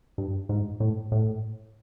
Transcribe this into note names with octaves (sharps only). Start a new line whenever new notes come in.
G2
G#2
A2
A2